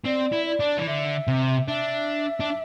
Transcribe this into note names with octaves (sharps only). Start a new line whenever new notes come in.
C4 D5
E4
D5
D4
E3
D3 E5
C3
D4 E5
D4